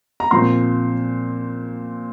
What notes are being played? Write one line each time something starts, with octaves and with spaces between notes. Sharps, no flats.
A#5
A#2 F3 C4 C6